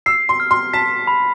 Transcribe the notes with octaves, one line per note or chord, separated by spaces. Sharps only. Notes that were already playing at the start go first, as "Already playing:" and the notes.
E6 C7
C6
F6
C6
A5 B6
B5